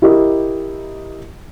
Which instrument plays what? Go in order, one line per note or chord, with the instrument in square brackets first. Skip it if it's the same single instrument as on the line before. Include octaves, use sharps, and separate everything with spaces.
[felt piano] E4 G4 A#4 D#5